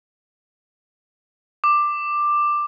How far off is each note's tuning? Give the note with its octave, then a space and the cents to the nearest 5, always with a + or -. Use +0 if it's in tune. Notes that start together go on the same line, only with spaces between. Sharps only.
D6 +10